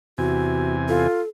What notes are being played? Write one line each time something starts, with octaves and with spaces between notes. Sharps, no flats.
E2 C3 F#4 G#5
F4 A4